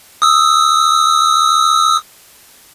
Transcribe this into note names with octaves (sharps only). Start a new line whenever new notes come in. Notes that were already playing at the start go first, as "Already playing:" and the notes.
D#6 E6